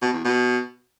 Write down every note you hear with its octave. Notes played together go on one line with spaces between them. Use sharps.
B2
E2
B2